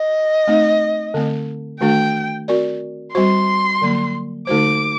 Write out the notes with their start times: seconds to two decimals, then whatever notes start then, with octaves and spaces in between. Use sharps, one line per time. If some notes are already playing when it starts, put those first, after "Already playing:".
Already playing: D#5
0.48 A3 C4 D#4
1.14 D3 A3 C4
1.81 D#3 A3 D4 F#4 A4 G5
2.48 C4 F#4 A#4 D5
3.14 G3 C4 F#4 C5 C6
3.82 D3 F#3 A#3
4.47 D3 A3 D#4 F#4 C5 D6